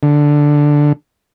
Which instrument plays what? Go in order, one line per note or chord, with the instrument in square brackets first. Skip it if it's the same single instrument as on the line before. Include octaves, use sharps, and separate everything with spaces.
[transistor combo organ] D3